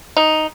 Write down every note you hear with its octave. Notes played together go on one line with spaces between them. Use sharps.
D#4